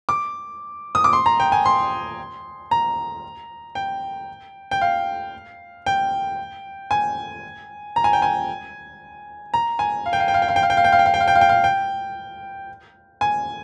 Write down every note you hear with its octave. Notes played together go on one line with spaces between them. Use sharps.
D6
D#6
D6
C6
A#5
G5
G#5
C6
A#5
G5
G5
F5
G5
G#5
A#5
G#5
G5
G#5
A#5
G#5
F5
G5
F5
G5
F5
G5
F5
G5
F5
G5
F5
G5
F5
G5
F5
G5
F5
G5
F5
G5
F5
G5
G#5